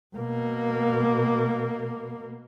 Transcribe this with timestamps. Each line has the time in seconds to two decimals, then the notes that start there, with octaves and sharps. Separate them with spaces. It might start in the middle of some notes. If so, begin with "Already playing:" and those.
0.16 B2 A#3